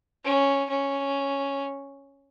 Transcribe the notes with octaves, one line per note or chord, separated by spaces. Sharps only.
C#4
C#4